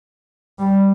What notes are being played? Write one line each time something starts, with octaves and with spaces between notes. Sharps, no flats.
G3